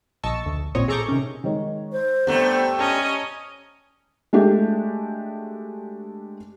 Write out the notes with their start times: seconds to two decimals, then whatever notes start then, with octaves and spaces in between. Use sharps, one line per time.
0.23 A#1 D#5 A5 C#6 E6
0.46 D2
0.75 A1 A#2 C4 C#5 D#5
0.88 G#4 A4 A#5 C#6 D6 G6
1.08 C3 D#3 C#4
1.44 D#3 G#3 C#5
1.92 C5
2.27 G2 A3 B3 F#5 A#5
2.79 C#4 D#5 A5 A#5 A#6
4.33 G#3 A3 D4 F#4 G4